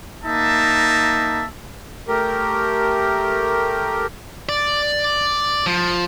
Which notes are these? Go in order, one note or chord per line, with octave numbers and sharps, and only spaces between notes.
A#3 D#4 E5 A5
A3 G4 A#4
D5
F3